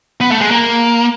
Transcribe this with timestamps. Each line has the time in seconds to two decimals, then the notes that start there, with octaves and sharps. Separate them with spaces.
0.21 B3
0.31 A3
0.41 G#3
0.51 A#3